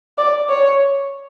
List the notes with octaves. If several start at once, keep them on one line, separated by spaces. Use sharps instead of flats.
D5
C#5